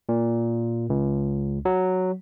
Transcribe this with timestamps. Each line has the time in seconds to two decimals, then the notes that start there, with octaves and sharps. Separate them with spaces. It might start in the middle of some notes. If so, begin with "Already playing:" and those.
0.09 A#2
0.90 C#2
1.65 F#3